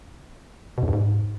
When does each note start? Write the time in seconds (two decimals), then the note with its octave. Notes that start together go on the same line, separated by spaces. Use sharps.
0.78 B2
0.83 E2
0.88 G2
0.93 G#2